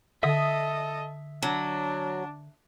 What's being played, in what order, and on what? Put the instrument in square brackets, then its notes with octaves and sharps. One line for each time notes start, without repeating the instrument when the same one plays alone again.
[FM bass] D3 [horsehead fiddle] A4 D#5 [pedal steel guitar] E5 D#6
[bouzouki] F#3 [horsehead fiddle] D4